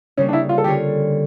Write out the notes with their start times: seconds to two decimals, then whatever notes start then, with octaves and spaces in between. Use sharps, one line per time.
0.17 C#3 G3 A#3 C#4
0.29 D4
0.33 E4
0.49 F4
0.58 A4
0.64 D3 G3 C#4 F4 G4 C#5